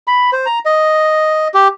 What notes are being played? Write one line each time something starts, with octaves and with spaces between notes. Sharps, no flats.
B5
C5
A#5
D#5
G4